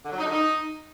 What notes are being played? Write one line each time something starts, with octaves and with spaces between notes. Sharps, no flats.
D3
F#3
D#4
D3
D#4